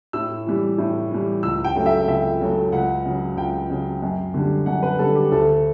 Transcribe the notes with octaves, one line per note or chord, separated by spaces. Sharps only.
A2 E6
E3 G3
A2
E3 G3
C#2 E6
G5
C#3 F#3 A3
E5
C#2 E5
C#3 F#3 A3
C#2 F#5
C#3 F#3
C#2 G5
C#3 F#3
F#2
D3 G3
F#2 F#5
B4
D3 G3 A4
G4
D2 A4